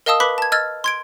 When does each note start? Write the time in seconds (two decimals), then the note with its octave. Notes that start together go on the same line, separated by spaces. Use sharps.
0.06 A#4 D#5 F5 A5 D#6 E6
0.20 B4 B5 D6 F#6 B6
0.38 A5 G#6
0.52 D#5 E6 F6 G#6 A6
0.84 C6 G#6 D7